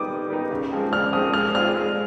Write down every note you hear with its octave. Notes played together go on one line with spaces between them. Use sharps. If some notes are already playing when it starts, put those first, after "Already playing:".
Already playing: G3 B3 D#4 D6 D#6
D#3
G3 B3 D#4
C#3
F3 G#3 C4
C#3 F6
F3 G#3 C4 D#6
G#3 F6
C4 F4 G#4 F6
G#3